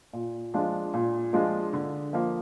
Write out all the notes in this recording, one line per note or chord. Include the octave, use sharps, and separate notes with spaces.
A#2
F3 G#3 D4 F4
A#2
F3 G#3 D4 F4
D3
F3 A#3